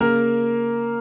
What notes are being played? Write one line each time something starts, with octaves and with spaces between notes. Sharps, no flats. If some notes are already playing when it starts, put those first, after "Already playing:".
C#3 A#3 A#4